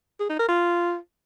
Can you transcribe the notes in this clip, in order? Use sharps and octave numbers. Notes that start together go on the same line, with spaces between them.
G#4
D#4
A#4
F4